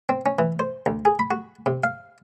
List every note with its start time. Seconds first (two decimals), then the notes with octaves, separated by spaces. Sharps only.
0.09 C4
0.26 C#4
0.39 E3
0.59 C5
0.86 D2
1.05 G#4
1.19 B5
1.31 F#4
1.66 C3
1.84 F5